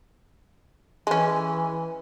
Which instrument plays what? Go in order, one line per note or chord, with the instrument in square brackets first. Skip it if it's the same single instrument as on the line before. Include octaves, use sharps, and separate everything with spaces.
[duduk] E3 [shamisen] G#3 C#4